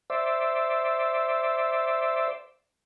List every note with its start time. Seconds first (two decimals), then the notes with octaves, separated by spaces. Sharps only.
0.10 C5 D5 E5